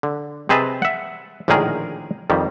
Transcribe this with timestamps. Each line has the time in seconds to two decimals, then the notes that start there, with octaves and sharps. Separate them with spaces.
0.03 D3
0.49 C3 C4 G#4 B4 D#5 A5
0.82 E5 F#5
1.48 A#1 A2 D3 D#3 G#4 A#4
2.30 F2 D#3 G3